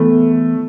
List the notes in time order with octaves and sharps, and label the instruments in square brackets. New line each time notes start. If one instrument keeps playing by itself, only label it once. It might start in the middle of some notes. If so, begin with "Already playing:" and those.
Already playing: [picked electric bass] E3 B3 [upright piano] A3